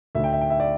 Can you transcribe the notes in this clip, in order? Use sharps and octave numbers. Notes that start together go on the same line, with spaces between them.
D2 D3 E5
G5
E5
G5
E5
D5